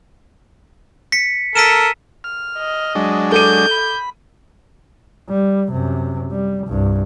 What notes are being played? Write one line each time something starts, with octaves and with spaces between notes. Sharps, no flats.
B6 C#7
A4 A#4 B6 D#7 E7
F6
D#5
F#3 G#3 D4
A4 D6 G6 D#7
B5
G3
F#2 C3
G3
C2 G2